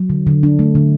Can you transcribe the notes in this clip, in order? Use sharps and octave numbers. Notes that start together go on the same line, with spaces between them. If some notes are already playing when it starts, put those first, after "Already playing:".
Already playing: F#3
D3
D3
D4
A3
D3